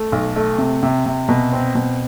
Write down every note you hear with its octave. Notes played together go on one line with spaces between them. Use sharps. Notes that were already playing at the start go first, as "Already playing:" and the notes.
Already playing: A3
B1
A3
C3
C3
C3
B2
C4
B2